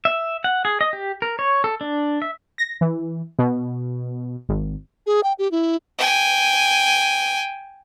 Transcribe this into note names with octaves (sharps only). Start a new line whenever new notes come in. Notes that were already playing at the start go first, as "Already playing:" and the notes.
E5
F#5
G#4
D#5
G4
A#4
C#5
A4
D4
E5
A#6
E3
B2
G#1
G#4
G5
G4
E4
G5 G#5